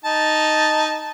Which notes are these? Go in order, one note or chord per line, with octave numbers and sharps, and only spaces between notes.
D#4 A5